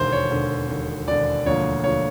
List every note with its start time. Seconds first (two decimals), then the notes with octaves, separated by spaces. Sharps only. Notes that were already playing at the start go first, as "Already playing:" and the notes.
Already playing: E1 D#2 D3 C5
0.12 C#5
0.31 E1 D#2 D3
0.69 E1 D#2 D3
1.07 E1 D#2 D3 D5
1.46 E1 D2 D3 F3 A#3 C#5
1.84 D3 F3 A#3 C#5